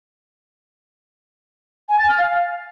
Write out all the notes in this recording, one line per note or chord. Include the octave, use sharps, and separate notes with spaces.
G#5
A6
F6
F5